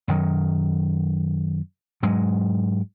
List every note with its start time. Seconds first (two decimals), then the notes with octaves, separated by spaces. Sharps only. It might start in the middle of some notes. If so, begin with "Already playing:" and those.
0.08 F#2 D#3 F#3
2.03 G#2 F#3 G#3